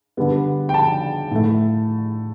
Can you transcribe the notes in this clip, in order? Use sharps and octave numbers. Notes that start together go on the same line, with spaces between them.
D3 G3 B3
G5
A5
A2 A3